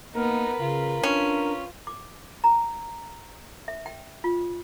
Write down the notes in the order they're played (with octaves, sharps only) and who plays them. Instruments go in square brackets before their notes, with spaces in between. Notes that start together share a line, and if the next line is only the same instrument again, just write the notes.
[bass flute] A#3 [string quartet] B3 D#4 [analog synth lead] A#4
[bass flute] C#3 [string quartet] F4 B4
[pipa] C#4 [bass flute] D4
[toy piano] D6
A#5
E5
G5
F4